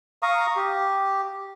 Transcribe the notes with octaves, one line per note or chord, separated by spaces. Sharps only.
F5 A#5 C#6 D#6
G4